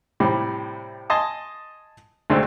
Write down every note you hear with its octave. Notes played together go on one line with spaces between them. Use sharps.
A2 C3 G3
D#5 G#5 A5 C6 D#6
D2 C3 G#3 A3 C4 D4